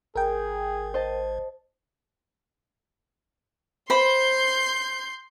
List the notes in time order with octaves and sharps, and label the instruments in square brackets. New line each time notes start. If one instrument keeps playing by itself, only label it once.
[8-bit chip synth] G#1 [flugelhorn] G#4 [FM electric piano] A#4 G5
[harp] C5 D#5 A5
[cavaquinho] C5 B5 [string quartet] C6 G6